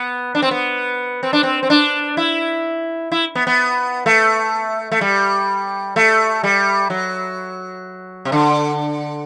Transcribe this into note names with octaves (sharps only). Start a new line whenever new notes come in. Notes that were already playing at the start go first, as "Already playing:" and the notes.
Already playing: B3
D4
C4
B3
C4
D4
C4
C4
D4
E4
E4
B3
B3
A3
A3
G3
A3
G3
F#3
C3
D3